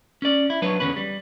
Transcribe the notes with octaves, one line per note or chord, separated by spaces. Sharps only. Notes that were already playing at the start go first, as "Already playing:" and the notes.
C#4 D5
E4
F#3 D4 B4 C#5
E2 G#2 D3 C#4 B4
G3